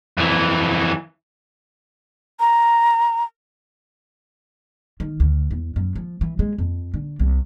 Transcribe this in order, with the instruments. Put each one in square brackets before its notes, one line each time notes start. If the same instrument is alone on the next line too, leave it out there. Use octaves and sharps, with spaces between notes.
[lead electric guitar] F2 E3
[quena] A#5
[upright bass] D#3
D2
E2
F#2
F3
E3
G#3
F2
D3
C2